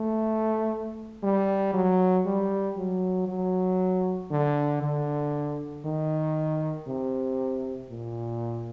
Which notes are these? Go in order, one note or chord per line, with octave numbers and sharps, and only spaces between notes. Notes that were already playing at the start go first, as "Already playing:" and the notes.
Already playing: A3
G3
F#3
G3
F#3
F#3
D3
D3
D#3
C3
A#2